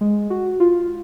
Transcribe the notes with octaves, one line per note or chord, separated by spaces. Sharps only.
G#3
F#4
F4